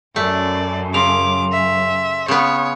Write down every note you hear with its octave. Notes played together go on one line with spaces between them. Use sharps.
F#2 A3 D5
C#3 C6 D6 F7
E5
C#3 B3 C#5